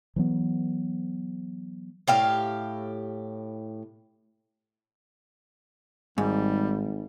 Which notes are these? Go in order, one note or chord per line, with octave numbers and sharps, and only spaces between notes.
E3 F#3 B3
A2 G4 F5
G#1 G#2 G3